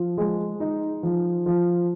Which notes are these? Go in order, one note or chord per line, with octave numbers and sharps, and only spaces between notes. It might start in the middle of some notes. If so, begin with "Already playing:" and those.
Already playing: F3
G#3
D#4
F3
F3